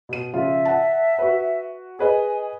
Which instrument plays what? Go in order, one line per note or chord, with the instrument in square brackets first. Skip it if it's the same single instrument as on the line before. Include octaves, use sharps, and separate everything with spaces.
[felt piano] B2 D#7
[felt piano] C#3 F3 F4 [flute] E5
[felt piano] F#5 A5
F#4 B4
[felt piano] G#4 B4 D#5 [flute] G#5